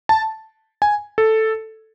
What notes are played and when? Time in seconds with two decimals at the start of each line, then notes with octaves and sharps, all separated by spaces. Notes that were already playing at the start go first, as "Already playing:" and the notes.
0.09 A5
0.82 G#5
1.18 A4